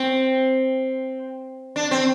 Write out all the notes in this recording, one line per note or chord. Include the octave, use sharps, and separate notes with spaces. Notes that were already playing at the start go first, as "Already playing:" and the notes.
Already playing: C4
D4
C4